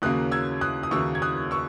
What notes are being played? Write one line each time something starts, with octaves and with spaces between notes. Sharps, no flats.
D#2 C#3 F#3 A#3 D#6 F#6
E6 G#6
D#6 F#6
D#6
D#2 C#3 F#3 A#3 C#6 E6
G#6
D#6 F#6
C#6 E6